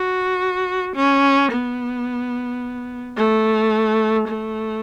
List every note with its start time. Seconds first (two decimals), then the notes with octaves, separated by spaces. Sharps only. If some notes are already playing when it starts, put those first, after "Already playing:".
Already playing: F#4
0.96 C#4
1.52 B3
3.17 A3
4.28 A3